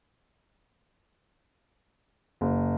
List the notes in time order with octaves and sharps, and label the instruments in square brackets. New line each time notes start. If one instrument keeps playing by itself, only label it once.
[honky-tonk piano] F#1